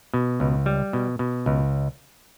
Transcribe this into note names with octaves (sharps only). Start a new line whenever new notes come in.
B2
C#2
G3
B2
B2
C#2